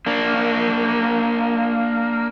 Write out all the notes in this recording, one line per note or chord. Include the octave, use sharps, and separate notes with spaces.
A#3 D4